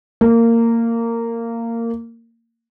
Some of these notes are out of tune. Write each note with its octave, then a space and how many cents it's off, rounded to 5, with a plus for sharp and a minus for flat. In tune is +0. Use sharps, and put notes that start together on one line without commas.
A#3 -15